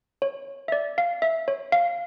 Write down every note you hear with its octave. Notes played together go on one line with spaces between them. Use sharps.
C#5
E5
D5
F5
E5
C#5
F5